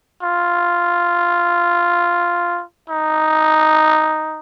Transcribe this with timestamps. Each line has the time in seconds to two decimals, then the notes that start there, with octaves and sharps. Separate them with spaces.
0.23 F4
2.89 D#4